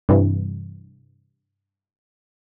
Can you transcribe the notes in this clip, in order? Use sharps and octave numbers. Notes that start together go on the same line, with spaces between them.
G2 C3 E3